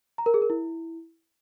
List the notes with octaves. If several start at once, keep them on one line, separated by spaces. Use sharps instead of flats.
A#5
A#4
G#4
A#4
E4